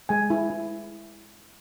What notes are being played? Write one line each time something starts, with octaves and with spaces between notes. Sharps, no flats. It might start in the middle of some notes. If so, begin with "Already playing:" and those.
G#3 G#5
E4
E4